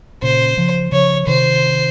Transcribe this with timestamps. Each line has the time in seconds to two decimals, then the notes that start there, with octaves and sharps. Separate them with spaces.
0.22 A#2 C#3 C5
0.57 C#3 F3
0.92 C#3 F3 C#5
1.27 C3 D#3 C5